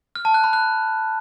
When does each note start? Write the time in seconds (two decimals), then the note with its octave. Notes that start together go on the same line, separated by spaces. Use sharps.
0.15 F6
0.25 A5
0.34 F#6
0.44 B5
0.53 F#6